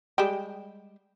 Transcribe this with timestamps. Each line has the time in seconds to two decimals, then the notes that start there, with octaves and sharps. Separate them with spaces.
0.18 G3 G#3 G4